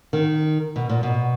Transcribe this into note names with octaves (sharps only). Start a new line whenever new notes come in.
D#3
B2
A#2
B2